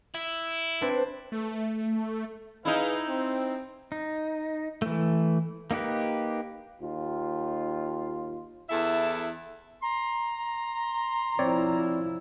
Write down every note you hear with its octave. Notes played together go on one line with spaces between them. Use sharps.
E4
C4 D4 B4
A3
D#4 E4 G#4 B4 F5
C4
D#4
E3 A3
A#3 D#4 G4 B4
D#2 F4
E2 E4 A4 E5
A#5 C6
F3 C4 E4 C#5 D5